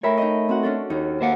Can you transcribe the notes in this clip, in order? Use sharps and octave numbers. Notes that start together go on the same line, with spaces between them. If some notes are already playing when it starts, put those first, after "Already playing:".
A3 A#4 C#5 E5 G5 B5
D#4 D#5
C4 F#4 F#5
C#4 D4 A4
D#2 D#4
A#3 C5 E5 F#5